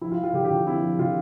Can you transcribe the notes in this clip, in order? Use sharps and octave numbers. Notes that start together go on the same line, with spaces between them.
F3 E4
F4
F3
F4
D3 G4
G4
D3 F4
C4 E4
F3
D3 F4